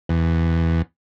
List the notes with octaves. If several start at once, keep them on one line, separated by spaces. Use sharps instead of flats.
E2